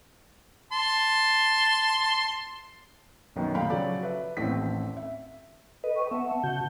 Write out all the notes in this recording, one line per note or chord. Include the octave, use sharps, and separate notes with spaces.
A5 C6
B1 F#2 D#3 B3
A#1 A3 F5 G5 B5
C#3 F3 F#3 A4 C#5 D5
B4 E5
A1 D#2 A2 A3 C4 B6
E5
A4 B4 D#5
G5 C#6
B3 E5 F#5 A5
C#3 F#4 G6